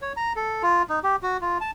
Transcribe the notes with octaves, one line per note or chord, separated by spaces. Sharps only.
C#5
A#5
A4
F4
D#4
G4
F#4
F4
A5